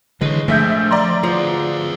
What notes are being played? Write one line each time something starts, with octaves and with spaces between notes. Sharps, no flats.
D3 E3 G#3 B4 C#5
A#1 F3 A3 E5 G6
D5 A#5 C6
D2 F3 G#4 B4